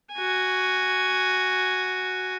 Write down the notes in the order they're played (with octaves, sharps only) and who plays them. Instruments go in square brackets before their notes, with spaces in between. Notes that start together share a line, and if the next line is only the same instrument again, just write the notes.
[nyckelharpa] F#4 G#5